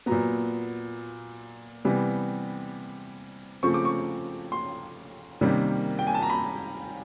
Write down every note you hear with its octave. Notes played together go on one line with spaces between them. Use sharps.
A#2 F#3 B3 A#5
C3 E3 G3 B3
C#3 F3 A3 C4 C#6
D6
C#6
C6
C3 D#3 G3 A#3 C#4
G5
G#5
A5
A#5
B5